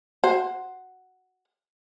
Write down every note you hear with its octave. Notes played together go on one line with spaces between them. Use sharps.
F#4 C5